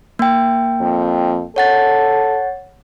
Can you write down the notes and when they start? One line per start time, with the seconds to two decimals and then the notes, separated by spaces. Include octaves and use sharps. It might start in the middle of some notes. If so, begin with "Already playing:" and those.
0.19 A#3 G5
0.81 F2
1.56 A4 C#5 F#5 A6